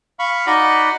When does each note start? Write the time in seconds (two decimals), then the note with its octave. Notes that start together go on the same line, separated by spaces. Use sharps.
0.19 F5 B5 C#6
0.47 D#4 F#4 D5 D#5 F#5 B5